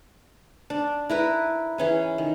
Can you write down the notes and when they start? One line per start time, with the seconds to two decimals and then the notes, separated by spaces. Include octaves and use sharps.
0.70 D4
1.09 E4 A#4 B4
1.78 E3 C#4 G#4
2.18 D#3